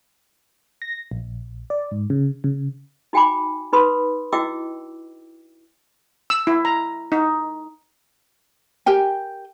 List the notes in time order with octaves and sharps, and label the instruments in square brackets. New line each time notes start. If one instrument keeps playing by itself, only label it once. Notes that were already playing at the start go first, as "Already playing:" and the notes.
[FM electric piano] A#6
A#1
D5
G#2
C#3
C#3
[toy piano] D#4 F#4 G5 G#5 B5 D6
D#4 B4 B5 C6 D#6
E4 F#4 D#5 G5 D6 E6
[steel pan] E6
E4
A#5
D#4
[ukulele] G4 A#4 G5 G#5